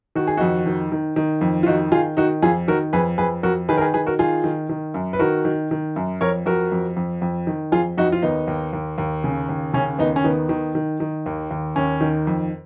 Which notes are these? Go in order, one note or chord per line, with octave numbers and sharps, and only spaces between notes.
D#3 F#4
G#4
F2 D#4 F#4
D#3
D#3
D#3
F2
F4
D#3 D#4 F#4
D#3 F4 G#4
D#3 D#4 F#4
F2 F4 G#4
D#3 F#4 A#4
F2 G#4 B4
F2 G#4 B4
F2 F#4 A#4
D#3 G#4 B4
A#4
G#4 B4
D#3 G#4 B4
F#4 A#4
D#3 F4 G#4
D#3
D#3
F#2
B4
D#3 F#4 A#4
D#3
D#3
F#2
F2 A#4 C#5
F2 F#4 A#4
F2
F2
F2
D#3
F2 F4 G#4
F2 D#4 F#4
F4
D#2 B3 D#4
D#2
D#2
D#2
C#3
D#2
C#3 C#4
D#2 B3 D#4
C#4
D#3 B3
D#3
D#3
D#3
D#2
D#2
D#2 C#4
D#3
F2